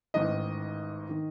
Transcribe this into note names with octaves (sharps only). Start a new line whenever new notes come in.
A1 G#2 D#3 D#5
D#3